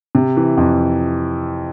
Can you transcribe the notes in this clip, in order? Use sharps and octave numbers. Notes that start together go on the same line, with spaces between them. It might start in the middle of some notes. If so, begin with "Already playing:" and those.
C3
E3
F2